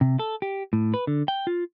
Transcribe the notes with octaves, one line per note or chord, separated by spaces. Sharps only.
C3
A4
G4
A2
B4
D3
G5
F4